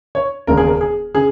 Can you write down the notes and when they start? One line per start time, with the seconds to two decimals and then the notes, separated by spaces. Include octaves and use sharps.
0.15 C#5
0.47 E1 D#2 C#3 A#4
0.57 G#4
0.67 A#4
0.81 G#4
1.15 C#3 G#4